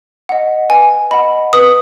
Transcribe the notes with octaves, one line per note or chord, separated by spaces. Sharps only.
D#5 F#5
B4 G#5
D#5 F#5 B5
B4 D#6